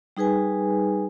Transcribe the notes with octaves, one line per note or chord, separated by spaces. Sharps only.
G3 D#4 G#4 B4 G#5